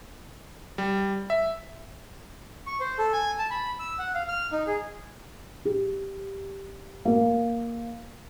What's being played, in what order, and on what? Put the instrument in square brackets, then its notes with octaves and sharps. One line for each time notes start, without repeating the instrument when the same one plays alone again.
[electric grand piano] G3
E5
[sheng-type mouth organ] C#6
C5
A4
G#5
A5
B5
E6
F#5
F5
F6
D#4
G#4
[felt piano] G4
A#3